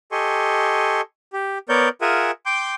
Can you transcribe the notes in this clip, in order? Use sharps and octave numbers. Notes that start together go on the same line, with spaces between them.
G4 A4 D#5 G#5 C6 C#6
G4
B3 A#4 C#5 D5 G6
F4 G#4 A#4 E5 F#5 G#5
G5 C6 D6 G6